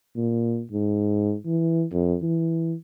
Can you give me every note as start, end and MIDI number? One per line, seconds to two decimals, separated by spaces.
0.16 0.62 46
0.71 1.34 44
1.45 1.84 52
1.92 2.16 41
2.22 2.74 52